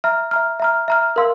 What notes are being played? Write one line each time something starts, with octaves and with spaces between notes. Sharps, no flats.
E5 A#5 F6
E5 A#5 F6
E5 A#5 F6
E5 A#5 F6
A#4 F5 C6 E6